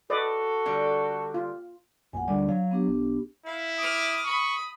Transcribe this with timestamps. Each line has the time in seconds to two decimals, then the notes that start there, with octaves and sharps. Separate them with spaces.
0.10 F#4 A4 B4 D5 D#5
0.66 D3 G3
1.34 F4
2.13 A#1 F#2 F#5 G#5
2.28 D2 G3 D4 D5
2.49 F#3 F5
2.71 B3 D4 G4
2.87 B1
3.46 E4 F5
3.78 D6 D#6 F6
4.26 B5 C#6